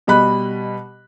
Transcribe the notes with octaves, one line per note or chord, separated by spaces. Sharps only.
B2 G3 D#5 B5 F#6